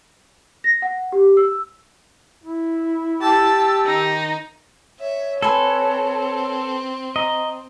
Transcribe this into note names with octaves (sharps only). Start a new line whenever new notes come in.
A#6
F#5
G4
E6
E4
G4 A5 E6
D#3 D#4
C#5 E5
C4 A4 B4 C5 G#5
D#5 A#5